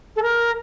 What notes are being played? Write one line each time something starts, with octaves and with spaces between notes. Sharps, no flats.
A4
A#4